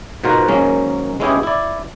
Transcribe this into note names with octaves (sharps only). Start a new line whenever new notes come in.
G#2 B2 F4 F#4 A#4 C5
G#2 D#3 F#3 G#3 A#3 C#4
G#3 B3 C#4 E4 G4 G#4
E4 D5